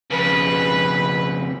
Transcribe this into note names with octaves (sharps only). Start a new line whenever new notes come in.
F2 C#3 B4